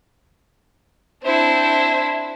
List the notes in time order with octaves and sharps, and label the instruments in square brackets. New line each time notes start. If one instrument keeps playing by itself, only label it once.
[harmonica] C4 C5 [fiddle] D4 E4